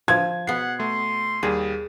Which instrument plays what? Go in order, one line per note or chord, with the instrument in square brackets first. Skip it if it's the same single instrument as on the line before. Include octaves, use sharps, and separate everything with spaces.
[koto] F3 [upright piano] G#6
[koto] B2 B3 [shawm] F#5 [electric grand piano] C7
[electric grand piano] A3 [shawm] C6
[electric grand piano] D#2 G3 [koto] G#4